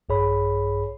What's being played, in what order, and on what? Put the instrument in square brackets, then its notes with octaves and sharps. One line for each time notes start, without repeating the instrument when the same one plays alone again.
[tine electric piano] A#1 G2 G#4 C#5 B5